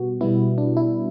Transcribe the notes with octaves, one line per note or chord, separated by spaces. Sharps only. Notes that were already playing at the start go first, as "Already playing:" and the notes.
Already playing: B2 G3 B3 F#4
B2 G3 B3 E4
D4
E4